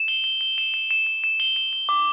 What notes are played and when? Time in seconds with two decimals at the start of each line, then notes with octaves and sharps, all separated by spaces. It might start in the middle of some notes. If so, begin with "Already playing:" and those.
Already playing: E7
0.08 G7
0.24 G7
0.41 G7
0.58 E7
0.74 E7
0.91 E7
1.07 E7
1.24 E7
1.40 G7
1.56 E7
1.73 G7
1.89 D6